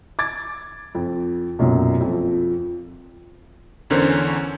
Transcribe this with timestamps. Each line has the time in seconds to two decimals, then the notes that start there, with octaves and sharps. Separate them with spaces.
0.19 D6 G#6 A6
0.95 F2
1.59 B1 F#2 A#2 F#3
2.00 F2 F3
3.90 E2 D3 C#4 A#4 C5 C#5